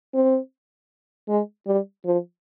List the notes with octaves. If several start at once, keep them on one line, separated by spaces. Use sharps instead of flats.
C4
G#3
G3
F3